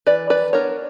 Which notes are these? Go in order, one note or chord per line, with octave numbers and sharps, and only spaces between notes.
E3 B4 D5
B4 D5
B3 D4 A#4 C#5